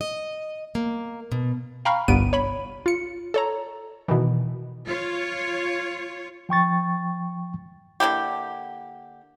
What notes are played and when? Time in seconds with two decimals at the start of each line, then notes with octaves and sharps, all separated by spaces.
0.01 D#5
0.75 A#3
1.32 B2
1.85 F5 G5 A#5 B5 C#6 F6
2.08 G1 C2 G2 B3 D7 D#7
2.33 C#5 B5
2.86 F4 C#7
3.34 A4 C#5 A#5
4.08 B2 D#3 E3
4.86 F4 C#5
6.49 F3 G5 C#6 A6
8.00 D3 A#3 E4 G4